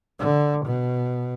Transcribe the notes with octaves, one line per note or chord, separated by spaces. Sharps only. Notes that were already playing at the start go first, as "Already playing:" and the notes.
D3
B2